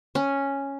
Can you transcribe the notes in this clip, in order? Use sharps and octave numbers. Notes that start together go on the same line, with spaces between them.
C#4